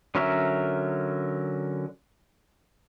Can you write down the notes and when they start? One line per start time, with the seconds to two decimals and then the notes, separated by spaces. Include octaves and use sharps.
0.15 D3 F#3 C#4 A#4 E5